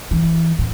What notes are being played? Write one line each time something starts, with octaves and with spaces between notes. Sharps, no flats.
E3
A2